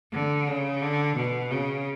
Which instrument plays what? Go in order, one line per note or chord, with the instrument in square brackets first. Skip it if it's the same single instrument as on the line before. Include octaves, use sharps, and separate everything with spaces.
[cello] D3
C#3
D3
B2
C#3